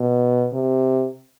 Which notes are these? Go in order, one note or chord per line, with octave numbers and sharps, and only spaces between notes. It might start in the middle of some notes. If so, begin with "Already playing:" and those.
Already playing: B2
C3